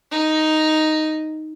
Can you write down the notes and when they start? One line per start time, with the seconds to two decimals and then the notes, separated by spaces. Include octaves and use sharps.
0.11 D#4